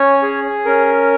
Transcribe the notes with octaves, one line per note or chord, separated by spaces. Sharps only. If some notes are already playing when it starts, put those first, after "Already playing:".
Already playing: C#4 C#5
G#4
C#4 A#4